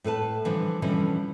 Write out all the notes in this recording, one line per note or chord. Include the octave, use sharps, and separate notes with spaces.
A2 A4 B4 A5
D3 E3 F3 G3 B3 D4
B2 D3 E3 F3 G3 C#4